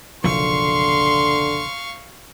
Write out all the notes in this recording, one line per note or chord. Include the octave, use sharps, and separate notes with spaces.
F#1 B1 D3 F3 F5 C6 C#6